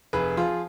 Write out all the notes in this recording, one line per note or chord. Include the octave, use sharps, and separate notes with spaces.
F1 G#4 B4
F3 F4 G#4